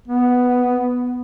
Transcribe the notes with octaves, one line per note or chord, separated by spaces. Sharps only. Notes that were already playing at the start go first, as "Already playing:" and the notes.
B3